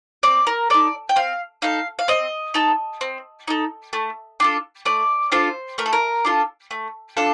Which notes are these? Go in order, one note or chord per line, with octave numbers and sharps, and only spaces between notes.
C4 D5
A#4
D#4 A4 D5
G5
C4 F5
D#4 A4 F5
F5
C4 D#5
D#4 A4
C4
D#4 A4
A3
D4 F4 A4
A3 D5
D4 F4 A4 C5
A3 A#4
A4
A#4
D4 F4 A4
A3
D4 F4 A4